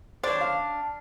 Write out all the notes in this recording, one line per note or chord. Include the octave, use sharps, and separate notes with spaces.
D4 C5 C#5
F5